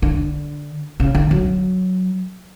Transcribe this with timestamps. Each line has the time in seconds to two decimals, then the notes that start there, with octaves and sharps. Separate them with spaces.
0.02 D3
1.00 C#3
1.15 D3
1.31 F#3